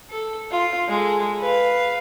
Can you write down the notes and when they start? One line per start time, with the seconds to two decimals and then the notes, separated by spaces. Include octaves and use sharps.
0.10 A4
0.51 F4
0.89 G#3 A4
1.40 B4 F5